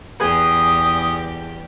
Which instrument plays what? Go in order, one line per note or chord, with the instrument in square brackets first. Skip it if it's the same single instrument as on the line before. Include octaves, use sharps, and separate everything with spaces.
[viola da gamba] E2 G4 D5 [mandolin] G#4 B4 [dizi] D#6